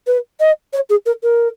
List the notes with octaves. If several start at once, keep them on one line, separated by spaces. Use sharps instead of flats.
B4
D#5
C#5
G#4
A#4
A#4